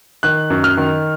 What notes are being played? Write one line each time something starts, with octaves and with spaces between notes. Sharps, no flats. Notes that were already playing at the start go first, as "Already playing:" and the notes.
D#3 F#6
F#2
F6
D#3